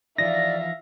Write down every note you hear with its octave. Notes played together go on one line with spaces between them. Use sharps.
E3 F3 D#4 D5 E5 F5 A#6